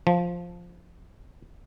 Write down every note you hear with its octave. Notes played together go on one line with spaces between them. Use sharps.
F3